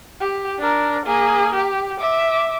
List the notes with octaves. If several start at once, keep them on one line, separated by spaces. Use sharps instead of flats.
G4
D4 A#4
A#3 G#4
G4
E5 D6